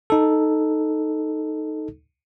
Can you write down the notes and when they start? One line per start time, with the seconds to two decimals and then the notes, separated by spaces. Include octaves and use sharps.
0.10 D#4 A4